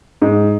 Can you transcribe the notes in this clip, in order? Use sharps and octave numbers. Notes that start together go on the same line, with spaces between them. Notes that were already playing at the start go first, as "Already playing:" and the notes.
G#2